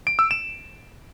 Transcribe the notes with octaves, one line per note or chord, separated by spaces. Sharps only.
D7
E6
E7